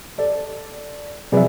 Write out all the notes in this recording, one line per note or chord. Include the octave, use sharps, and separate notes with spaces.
A4 D5
C3 F3 F#3 G#4 B4 D5 E5